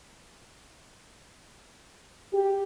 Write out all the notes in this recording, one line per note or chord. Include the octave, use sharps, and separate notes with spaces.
G4